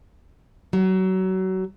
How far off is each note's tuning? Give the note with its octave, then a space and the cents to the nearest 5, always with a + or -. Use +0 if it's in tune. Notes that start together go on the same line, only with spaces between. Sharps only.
F#3 +25